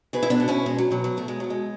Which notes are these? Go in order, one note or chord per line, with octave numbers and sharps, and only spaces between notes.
B2 G#4 B4
E4
B3 D4
B2
C#4 E4
B2 G#3
F#3
B2 F#3
F#3
B2 A3
G#3
B2 F#3
G#3